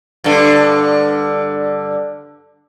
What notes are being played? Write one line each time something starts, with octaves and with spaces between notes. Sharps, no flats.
G2 D3